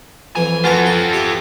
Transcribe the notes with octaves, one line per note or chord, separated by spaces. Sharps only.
F2 E3 F3 G#5
B3 F4 F#4 A4 A#4
G5
G4 E5